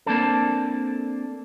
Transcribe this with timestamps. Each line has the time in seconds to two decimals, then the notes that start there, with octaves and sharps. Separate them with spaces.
0.06 A#3 C4 D4 A4